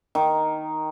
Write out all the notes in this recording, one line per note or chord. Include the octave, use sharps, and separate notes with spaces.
D#3